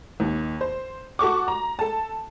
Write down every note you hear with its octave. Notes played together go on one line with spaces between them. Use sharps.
D#2
C5
F#4 A4 C#6 D6
A#5
A4 A5